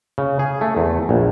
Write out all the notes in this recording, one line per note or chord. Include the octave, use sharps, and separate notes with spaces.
C#3
G#4
A3
E2
A#1